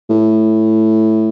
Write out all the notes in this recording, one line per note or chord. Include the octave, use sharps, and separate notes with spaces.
A2